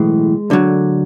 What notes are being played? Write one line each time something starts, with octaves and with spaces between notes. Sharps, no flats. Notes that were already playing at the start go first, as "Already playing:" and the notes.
Already playing: B1 A2 E3 G#3 G#4
D2 D3 F#3